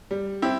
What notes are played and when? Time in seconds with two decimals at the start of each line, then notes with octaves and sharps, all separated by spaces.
0.11 G3
0.42 C4 E4 G4